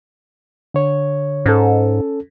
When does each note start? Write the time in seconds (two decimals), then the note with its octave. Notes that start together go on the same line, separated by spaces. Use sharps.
0.74 D3 C#5
1.46 G#2 C#4 A4